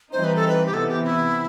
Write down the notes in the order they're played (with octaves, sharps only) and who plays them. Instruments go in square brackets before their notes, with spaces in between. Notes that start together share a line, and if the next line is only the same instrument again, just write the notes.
[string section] E3 G3 C4 D#4 [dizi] C5
[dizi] B4
A4
B4
G4
[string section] C3 E3 B3 [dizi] A4
[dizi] G4
E4